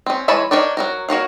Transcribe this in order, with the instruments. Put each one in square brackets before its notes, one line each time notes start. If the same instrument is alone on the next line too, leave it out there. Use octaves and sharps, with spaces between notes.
[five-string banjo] C4 C#4
E3 G#3 C#5 A5 B5
D4 D#4 A#4 C#5 D5
F#3 F#4 A#4
F#4 A#4 C#5 F5